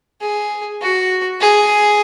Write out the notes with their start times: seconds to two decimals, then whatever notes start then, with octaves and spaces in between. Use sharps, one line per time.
0.21 G#4
0.81 F#4
1.41 G#4